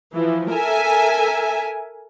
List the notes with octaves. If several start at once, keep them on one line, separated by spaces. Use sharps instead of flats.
E3 F3
A4 A#4 E5 G#5